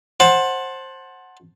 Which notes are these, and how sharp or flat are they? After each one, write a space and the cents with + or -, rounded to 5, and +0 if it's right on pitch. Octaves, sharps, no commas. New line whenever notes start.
C5 +20 F#5 +0 A5 +0